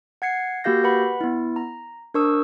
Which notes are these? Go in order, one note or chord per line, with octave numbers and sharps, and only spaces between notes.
F#5 G#6 C7 C#7
A#3 F#4 G4 F5 G6 A#6
B4 F#5 B5
B3 E4
A#5
D4 A#4 C5 C#6 D#6 E6